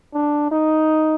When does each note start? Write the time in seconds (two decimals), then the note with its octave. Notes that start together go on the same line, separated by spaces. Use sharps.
0.14 D4
0.52 D#4